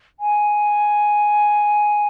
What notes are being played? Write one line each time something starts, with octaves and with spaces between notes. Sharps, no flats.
G#5